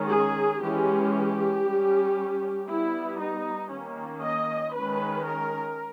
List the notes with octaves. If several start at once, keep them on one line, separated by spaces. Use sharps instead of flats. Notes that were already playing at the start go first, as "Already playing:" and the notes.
Already playing: D#3 G#3 C#4
G#4
E3 G#3 C#4 G4
G3 C#4
G3 B3 E4
D#4
D#3 A#3 C#4
D#5
D#3 G#3 C#4 B4
A#4